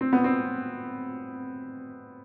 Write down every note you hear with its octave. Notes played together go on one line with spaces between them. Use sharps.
C4
B3
C4